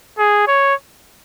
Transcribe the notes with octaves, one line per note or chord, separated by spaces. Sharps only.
G#4
C#5